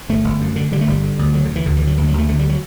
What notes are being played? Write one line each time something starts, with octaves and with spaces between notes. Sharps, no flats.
G1 A3
G1
F#2
D3
D3 G3
A3
G1 G3
D3
D2
D3 F#3
D3
D2 E3
D2 D3
D3 E3
F#3
D2 E3
G3
F#3
D2 A3
D3 A3
G3
F#3